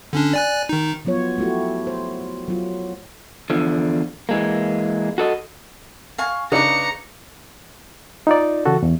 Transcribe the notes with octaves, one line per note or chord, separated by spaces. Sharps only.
D3 C#4 D4
D5 G#5 F#6
D#3 D#4
F3 F#3 B3 F4 C#5
A3 E4 F#4 G4
C5
F#3 F4
E2 D3 F3
E3 G#3 A#3
F#4 A4 D#5
F5 G#5 C#6
C#3 D4 D#4 B4 A#5 D6 C#7
D#4 F4 D5
C#3 E3 F#4 A4
E2